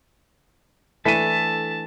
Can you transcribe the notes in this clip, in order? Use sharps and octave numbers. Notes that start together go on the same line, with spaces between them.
E3 A3 D4 A4 A5 B6 D#7